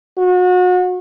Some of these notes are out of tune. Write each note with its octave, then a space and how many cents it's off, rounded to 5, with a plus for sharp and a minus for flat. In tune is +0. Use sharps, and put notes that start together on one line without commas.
F#4 -35